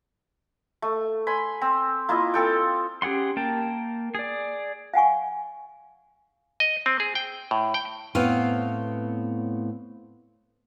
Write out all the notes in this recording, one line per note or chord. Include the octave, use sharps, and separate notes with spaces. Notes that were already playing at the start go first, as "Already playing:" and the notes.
A3
G#5 B5 C6
C4
A#3 E4 F4 D#5
C4 A4 G5
C#4 G4 G#4 F#5 C6
A#3 A#4 G5 A5
G#4 D5
F5 F#5 G#5 C#6
D#5
C4
G#4
G5
A2
G5
A2 B3 C4 C#5 F5